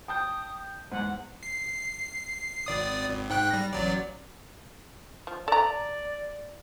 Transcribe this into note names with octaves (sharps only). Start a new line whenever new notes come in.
G5 A5 D#6 G6
E2 G#2 F#5
C7
G#1 D5 D#6
G#1
G#2 G5 F#6
G3 A#6
A1 F#3 D5
F3
A4 D5 A#5